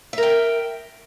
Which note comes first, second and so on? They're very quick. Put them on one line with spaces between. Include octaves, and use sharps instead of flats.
E5 A#4 G5